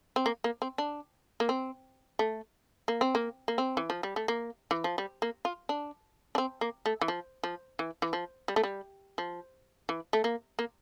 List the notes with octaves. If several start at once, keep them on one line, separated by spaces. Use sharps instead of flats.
C4
A#3
A#3
C4
D4
A#3
C4
A3
A#3
C4
A#3
A#3
C4
E3
F3
G3
A3
A#3
E3
F3
G3
A#3
F4
D4
D4
C4
A#3
A3
E3
F3
F3
E3
E3
F3
G3
A3
G3
F3
E3
A3
A#3
A#3